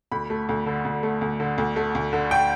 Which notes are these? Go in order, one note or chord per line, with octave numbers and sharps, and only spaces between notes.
D2 B5
A3
D2
D3
D2
A3
D2
D3
D2
A3
D2
D3
G5